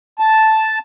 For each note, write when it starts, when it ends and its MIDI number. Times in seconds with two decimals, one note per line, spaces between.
0.19 0.79 81